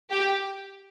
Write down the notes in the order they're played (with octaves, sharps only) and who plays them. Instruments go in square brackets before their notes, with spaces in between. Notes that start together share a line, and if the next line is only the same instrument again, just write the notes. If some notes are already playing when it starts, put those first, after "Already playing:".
[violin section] G4